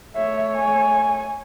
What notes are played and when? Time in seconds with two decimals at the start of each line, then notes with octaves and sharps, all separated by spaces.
0.16 A3 C#5 E5
0.56 G#5